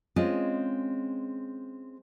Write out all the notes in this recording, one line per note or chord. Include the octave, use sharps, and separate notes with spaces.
G#3 C4 C#4 F4 D#5